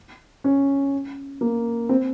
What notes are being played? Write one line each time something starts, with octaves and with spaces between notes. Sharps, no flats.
C#4
A#3
C4